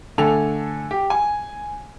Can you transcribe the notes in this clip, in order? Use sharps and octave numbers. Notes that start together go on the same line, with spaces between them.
D3 A3 A4 G#5 F7
G4
G#5